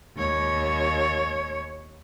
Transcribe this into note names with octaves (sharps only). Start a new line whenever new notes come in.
D#2 C#5